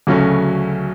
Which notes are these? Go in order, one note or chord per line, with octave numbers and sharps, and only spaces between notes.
D2 C#3 F#3 A3 C#4